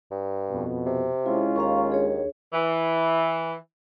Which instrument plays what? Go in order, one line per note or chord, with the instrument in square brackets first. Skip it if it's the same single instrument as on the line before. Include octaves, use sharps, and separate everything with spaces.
[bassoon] G2
[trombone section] F2 B2
[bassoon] C3
[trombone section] G#3 C#4 F4 [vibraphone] E4
[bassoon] D#2 [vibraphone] F5 A#5 C#6
[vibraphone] D4 G#4 C#5
[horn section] E3